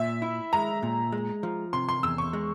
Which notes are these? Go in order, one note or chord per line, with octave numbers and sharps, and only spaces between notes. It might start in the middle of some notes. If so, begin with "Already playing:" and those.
Already playing: A#2 E5
E4
G#3 A#5
A#2
G#3
F3
C3 C6
C6
E2 E6
C#6
G#3